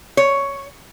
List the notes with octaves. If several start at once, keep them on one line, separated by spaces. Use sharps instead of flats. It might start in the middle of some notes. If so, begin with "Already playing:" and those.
C#5